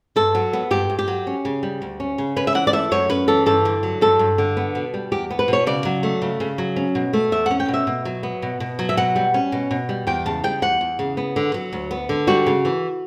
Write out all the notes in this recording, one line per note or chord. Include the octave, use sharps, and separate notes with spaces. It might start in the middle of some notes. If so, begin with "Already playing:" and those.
G2 A4
F#3
B3
G2 G4
G2
G4
F#3
C#4
C#3
G3
D2
C#4
C#3
C#4 B4
E5
E3 F#5
D5
A3 E5
F#2 C#5
C#4 B4
E3 A4
G2 A4
D3
F#3
G2 A4
G2
D3
B3
B2
G3
E2 G4
B3
B4
B2 C#5
C#3 D5
F#3
A3
C#3
C#3
F#3
C#4
B2
A3
E2 E5
C#4 F#5
G5
B2
E5
B2
F#3
B3
B2
B2
F#3
E5
B2 F#5
G3
C#4
B2
B2
G3
E2 G5
C#3 A5
G3 G5
E2 F#5
E2
C#3
B3
D3
F#3
D2
B3
D3
G3 F#4
C#3
E3